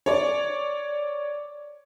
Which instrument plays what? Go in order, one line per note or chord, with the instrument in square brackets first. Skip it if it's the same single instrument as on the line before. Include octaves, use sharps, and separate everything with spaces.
[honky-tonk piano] C#5 D5